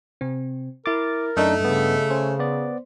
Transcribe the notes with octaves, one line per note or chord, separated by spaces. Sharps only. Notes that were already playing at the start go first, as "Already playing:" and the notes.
C3 C4
E4 A#4 D6 A6
F#2 A3 D4 D#4 D#5
G2 C#3 B3
C#4 C5
B3 D5